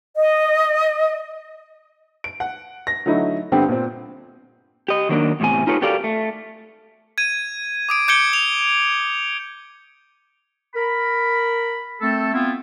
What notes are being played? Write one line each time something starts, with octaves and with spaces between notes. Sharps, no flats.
D#5
D7
F#5
A#6
D3 F#3 A3 D#4 E4
G2 D3 B3 C4 G4
A#2 C4
G4 D#5
D#3 F#3 A#3 D4
E2 A2 C3 G#5
D#4 F4 G4 A4 B4 C#5
F#4 G4 A4 A#4 D5 F5
A3
G#6 D#7
D6 D#6 D7
D6 G6 G#6 C#7 D7 G7
F7
A#4 B5
A3 C4 A4
B3 C4 E4 F4